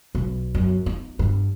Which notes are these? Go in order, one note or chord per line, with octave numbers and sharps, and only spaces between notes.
B1
F#2
D#4
G2